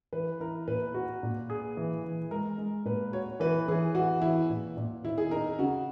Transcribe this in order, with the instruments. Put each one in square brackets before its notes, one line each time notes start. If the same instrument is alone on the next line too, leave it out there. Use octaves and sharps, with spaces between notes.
[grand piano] E3 [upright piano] B4
[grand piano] E4 [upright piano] A#4
[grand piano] A#2 [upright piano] B4
[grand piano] F#4
A#2
G#4
E3
E3
[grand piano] G#3 [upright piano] A#4
[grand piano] G#3
[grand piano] A#2 [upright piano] B4
[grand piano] F#4 [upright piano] C#5
[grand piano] E3 [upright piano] B4
[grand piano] E3 [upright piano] G#4
[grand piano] E3 [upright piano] F#4
[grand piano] E3 [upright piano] E4
[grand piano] A#2
A#2
[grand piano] D#3 [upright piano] E4
[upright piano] G#4
[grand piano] D#4 [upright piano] A#4
[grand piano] C#3 [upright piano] F#4